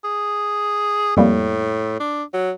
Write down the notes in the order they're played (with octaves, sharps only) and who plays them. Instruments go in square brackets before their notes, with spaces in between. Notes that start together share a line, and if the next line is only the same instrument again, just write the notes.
[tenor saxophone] G#4
[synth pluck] F2 G3 A#3 [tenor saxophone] A2
[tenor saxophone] D4
F#3